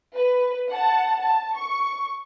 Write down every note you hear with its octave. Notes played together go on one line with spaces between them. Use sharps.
B4
F#5 A5
A5
C#6